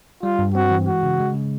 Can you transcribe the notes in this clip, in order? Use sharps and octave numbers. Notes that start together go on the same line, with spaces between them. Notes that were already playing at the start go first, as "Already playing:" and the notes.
G3 F4
G2
C4 F#4
E3
G#3 F#4
C#3
G#3
C#3